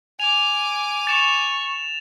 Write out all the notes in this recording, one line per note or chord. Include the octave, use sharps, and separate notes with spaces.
G#5 D6 F7
C#6 A6 E7 F7